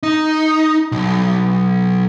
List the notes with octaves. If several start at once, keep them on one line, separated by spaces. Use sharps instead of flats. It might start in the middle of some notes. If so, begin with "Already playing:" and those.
D#4
B1